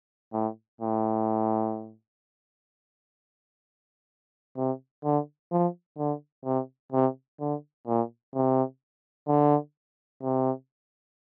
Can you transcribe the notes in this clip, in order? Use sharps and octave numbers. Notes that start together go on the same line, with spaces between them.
A2
A2
C3
D3
F3
D3
C3
C3
D3
A#2
C3
D3
C3